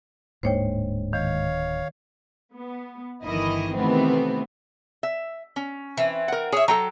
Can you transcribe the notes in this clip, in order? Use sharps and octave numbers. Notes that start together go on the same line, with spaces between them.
D1 G#2 G#3 A#3 D4 C5 C#5 G5
D#3 C#5 F5
B3
G1 D#3 E3 E4 D#5
C3 D#3 E3 A3 B3 C4
E5
C#4
E3 C4
A#4 F#5
G#4 C#5 E5
F#3 A4 G5 A#5